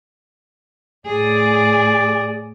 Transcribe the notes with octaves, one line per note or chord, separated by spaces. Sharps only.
A2 G#4 D5